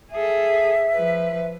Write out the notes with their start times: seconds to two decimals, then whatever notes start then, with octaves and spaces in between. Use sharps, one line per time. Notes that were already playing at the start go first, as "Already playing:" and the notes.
0.12 G#4 A4 E5
0.95 F3 B4